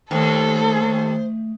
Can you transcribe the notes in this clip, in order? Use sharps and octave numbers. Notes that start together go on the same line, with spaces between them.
D#2 A3 A4 C5